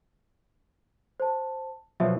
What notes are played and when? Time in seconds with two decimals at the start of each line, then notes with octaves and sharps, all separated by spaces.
1.20 C5 A5
2.00 B2 F3 F#3 E5